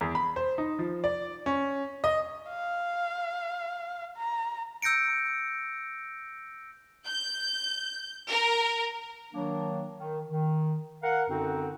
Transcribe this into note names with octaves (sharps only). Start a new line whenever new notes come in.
E2
B5
C5
D#4
F3
D5
C#4
D#5
F5
A#5
E6 G6 A#6 C#7 D7
G6
A#4
D#3 F#3 A#3 D4
D#3
D#3
A#4 F5 F#5
F#2 D3 C4 D#4 F#4